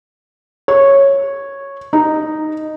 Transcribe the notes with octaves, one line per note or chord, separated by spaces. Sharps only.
C#5
D#4